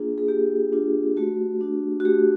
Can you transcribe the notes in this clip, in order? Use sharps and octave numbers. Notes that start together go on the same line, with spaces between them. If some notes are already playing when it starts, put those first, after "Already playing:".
Already playing: A#3 D4 F4 G#4
G#4
A#3 G4
D4 F4
A3 F#4
D4 F#4
F#4
A3 G4